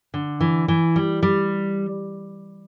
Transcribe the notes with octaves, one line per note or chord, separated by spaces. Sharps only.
D3
E3
E3
G3
G3